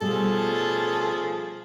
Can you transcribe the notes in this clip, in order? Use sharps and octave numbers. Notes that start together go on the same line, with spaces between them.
B2 F3 G3 A3 G#4 A4